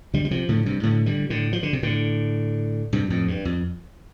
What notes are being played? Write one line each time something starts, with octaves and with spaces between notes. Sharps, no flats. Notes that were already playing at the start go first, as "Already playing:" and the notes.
D3 G3
G3
C3 F3
A2 D3
G2 C3
A2 D3
D3 G3
A2 D3
F3
D3
C3
A2 D3
G2 C3
F2 A2
G2
F2